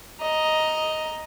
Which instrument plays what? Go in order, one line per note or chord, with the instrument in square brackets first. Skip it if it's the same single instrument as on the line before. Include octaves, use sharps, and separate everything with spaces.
[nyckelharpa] D#5 A#5